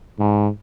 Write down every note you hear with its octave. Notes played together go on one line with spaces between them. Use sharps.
G#2